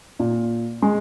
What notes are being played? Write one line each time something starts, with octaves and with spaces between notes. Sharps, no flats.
A#2
G#3